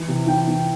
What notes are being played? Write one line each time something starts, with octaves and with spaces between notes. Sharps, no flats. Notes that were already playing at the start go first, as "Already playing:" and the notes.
Already playing: E3
C3
E3 G5
E3